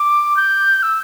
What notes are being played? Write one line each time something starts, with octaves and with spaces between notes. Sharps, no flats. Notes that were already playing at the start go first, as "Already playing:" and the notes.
Already playing: D6
G6
E6